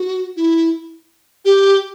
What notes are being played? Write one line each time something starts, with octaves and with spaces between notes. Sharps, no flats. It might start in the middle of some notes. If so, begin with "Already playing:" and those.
Already playing: F#4
E4
G4